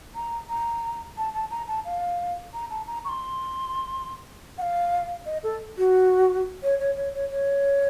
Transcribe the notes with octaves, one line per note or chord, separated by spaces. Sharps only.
A#5
A#5
A5
A5
A#5
A5
F5
A#5
A5
A#5
C#6
C6
F#5
F5
D#5
A4
F#4
C#5
C#5
C#5
C#5
C#5